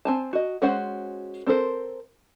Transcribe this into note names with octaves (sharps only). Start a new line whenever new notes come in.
C4 G#5 A5
F#4 D#5
G#3 C#4 F#4 C5 F#5
C4 A4 A#4 C5